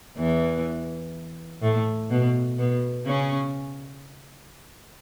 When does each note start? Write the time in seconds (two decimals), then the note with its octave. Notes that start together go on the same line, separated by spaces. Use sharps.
0.17 E2 E3
1.62 A2 A3
2.10 B2 B3
2.59 B2 B3
3.06 C#3 C#4